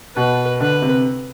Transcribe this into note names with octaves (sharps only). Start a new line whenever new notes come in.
B2 B4
D3 B4
C3